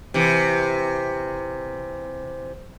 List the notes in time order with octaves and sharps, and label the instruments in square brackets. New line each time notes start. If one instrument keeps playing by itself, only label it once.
[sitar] C3 E3